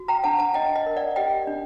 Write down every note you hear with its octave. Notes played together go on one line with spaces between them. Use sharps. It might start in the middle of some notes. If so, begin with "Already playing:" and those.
Already playing: F#4
G5 A#5
D4 F#5 A5
F#5 A5
D4 D#5 G5
D#5
A#4
D5 F#5
G4 D#5 G5
D4